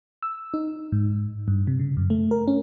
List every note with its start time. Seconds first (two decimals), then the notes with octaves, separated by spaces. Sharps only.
0.23 E6
0.54 D#4
0.92 G#2
1.48 G2
1.67 C3
1.79 C#3
1.97 F#2
2.10 A3
2.31 A#4
2.48 C#4